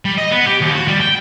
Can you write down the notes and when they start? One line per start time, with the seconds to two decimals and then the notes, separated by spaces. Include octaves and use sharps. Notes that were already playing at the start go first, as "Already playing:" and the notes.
0.05 G3
0.18 D#5
0.32 B3
0.47 G4
0.62 D#2
0.76 F#4
0.88 G3
1.00 G5